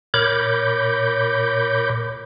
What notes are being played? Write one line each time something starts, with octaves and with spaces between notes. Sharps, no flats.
A#2 A#4 C#5 B5 D6 G6